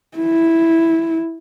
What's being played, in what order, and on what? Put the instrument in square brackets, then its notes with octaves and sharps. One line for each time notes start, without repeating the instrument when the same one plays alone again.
[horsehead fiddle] E4